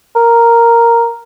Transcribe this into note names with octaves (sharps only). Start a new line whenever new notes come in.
A#4